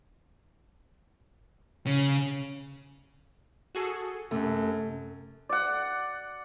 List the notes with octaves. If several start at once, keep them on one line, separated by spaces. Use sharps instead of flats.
C#3
F#4 G#4 A4
F#2 C3 A3
D5 F#5